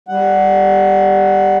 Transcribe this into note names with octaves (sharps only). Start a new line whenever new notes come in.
G3 F#5